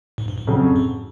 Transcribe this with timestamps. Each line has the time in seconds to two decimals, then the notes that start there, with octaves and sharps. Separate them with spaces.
0.18 G#2
0.28 G2
0.38 G#2
0.47 F2 C#3 F#3
0.76 G#2